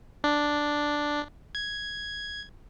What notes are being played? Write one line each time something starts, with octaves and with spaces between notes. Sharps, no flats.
D4
G#6